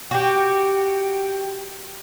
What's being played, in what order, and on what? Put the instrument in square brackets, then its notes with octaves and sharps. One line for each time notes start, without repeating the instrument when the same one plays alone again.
[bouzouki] F#4 G4 [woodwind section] G5